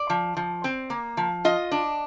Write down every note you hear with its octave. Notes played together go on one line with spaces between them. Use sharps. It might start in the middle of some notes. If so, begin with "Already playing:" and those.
Already playing: D5
F3
F3
C4
A#3
F3
F4 D#5
D4